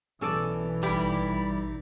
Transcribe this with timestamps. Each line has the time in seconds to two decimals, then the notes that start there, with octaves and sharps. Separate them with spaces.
0.21 B1 E3 B3 C#4 A4 D5
0.83 A1 G3 D#4 E4 G4 G5